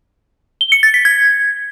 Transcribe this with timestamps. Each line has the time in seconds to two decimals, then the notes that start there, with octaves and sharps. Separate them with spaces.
0.61 G7
0.72 C#7
0.83 A6
0.94 B6
1.05 G#6